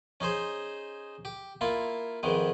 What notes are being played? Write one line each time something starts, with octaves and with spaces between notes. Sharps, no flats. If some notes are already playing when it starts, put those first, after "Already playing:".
C#4 D#4 G#4 C5
G4
A#3 E4 F4
F2 G#2 D#3 E3 G#3